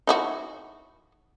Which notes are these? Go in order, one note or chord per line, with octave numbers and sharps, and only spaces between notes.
D#4 E4 F#4